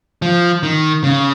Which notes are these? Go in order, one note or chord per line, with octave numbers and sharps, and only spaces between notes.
F3
D#3
C#3